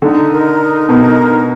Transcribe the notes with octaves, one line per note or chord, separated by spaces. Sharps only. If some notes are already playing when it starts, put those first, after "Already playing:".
D3 D#4
A#4
D#4
B2 A#4
D#4